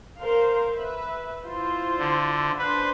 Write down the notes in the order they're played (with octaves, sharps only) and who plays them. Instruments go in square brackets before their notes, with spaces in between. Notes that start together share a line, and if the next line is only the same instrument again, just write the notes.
[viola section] A#4 C5 F5
B4 E5
E4 F4 C5
[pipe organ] D3
[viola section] D4 C5 [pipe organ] B4